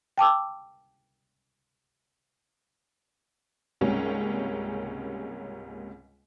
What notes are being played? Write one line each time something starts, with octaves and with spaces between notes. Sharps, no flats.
G5 A5 D6 E6
C#2 G#2 C3 G3 A#3 C#4